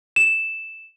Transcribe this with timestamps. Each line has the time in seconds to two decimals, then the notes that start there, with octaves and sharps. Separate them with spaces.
0.16 E7